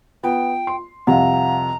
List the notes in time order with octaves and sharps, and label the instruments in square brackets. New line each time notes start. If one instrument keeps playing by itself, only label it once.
[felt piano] B3 [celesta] F4 [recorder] G5
[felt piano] C6
[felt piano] C2 F2 C3 [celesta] F5 F#5 [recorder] A#5